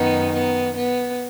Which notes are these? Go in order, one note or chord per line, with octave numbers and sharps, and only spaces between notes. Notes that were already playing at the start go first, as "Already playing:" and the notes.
Already playing: F#2 D#3 B3 D#4
B3
B3